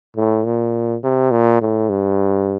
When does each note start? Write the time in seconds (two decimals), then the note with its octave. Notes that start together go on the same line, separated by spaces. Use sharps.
0.17 A2
0.45 A#2
1.04 C3
1.31 A#2
1.61 A2
1.89 G2